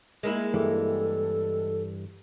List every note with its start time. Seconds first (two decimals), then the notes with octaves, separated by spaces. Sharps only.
0.23 G#3 A#3 E4
0.54 G2 E3 G3 A4